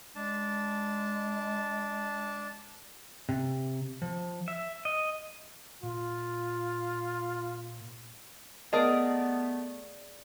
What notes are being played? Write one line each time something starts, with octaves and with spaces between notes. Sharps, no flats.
G#3 D4 A5
C3
F3
E5
D#5
A#2 F4
A3 B3 G#4 A#4 D5 D#5 A5